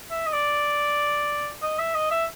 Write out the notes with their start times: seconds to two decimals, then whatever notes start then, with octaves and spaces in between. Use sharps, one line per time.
0.11 E5
0.26 D#5
0.32 D5
1.62 D#5
1.79 E5
1.95 D#5
2.11 E5